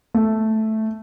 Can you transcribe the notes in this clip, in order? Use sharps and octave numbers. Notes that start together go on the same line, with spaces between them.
A3